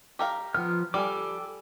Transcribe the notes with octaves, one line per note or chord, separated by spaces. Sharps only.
G4 A#4 F5
F3 B3 F6
G3 A4 G#5 D6